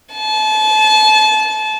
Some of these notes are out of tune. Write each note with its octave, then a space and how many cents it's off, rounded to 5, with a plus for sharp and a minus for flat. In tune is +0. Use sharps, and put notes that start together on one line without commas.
A5 -30